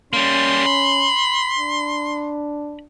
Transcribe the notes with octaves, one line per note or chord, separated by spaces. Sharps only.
G3 A#3 C#4 C6
B5
D4